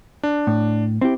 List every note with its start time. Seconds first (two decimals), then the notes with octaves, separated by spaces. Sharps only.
0.23 D4
0.47 A2
1.01 C4 E4 G4